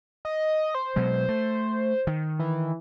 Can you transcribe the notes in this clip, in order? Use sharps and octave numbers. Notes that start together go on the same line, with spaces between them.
D#5
C5
B2 F#3 G#3
A3
D#3
E3